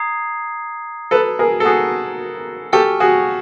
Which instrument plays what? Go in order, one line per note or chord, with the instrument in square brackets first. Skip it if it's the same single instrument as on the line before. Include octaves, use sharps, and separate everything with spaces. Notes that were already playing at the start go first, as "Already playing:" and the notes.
Already playing: [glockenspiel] A#5 D#6 G#6 C7
[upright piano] A4 B4
G#4 A#4
A4
F#4 G#4
[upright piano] G4 A4 [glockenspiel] G#5 C#6 F6
[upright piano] F#4 G#4